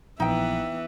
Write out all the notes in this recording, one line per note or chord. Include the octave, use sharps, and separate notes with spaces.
A#1 E3 B3 D#4 E5 G5